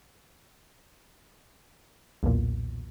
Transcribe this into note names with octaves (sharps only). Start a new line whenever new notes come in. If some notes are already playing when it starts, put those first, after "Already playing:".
B1 E2 A#2